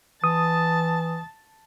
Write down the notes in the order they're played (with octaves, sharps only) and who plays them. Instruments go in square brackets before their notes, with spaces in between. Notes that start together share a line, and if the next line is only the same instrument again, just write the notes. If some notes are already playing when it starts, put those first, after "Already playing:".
[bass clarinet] E3 [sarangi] A5 [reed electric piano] D#6